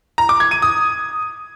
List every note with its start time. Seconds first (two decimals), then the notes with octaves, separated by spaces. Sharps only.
0.18 A#5
0.29 D6
0.40 G#6
0.51 D#7
0.62 D#6